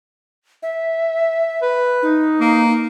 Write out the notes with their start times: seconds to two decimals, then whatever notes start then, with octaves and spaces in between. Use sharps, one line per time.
0.63 E5
1.62 B4
2.02 D#4
2.40 A#3